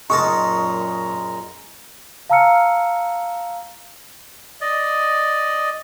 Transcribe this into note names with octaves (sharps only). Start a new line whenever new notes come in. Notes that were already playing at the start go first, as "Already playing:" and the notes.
F#2 A#2 G#3 D#4 A#4 A5 A#5 C#6
F5 A5 A#5 E6 F6 C#7
D5 D#5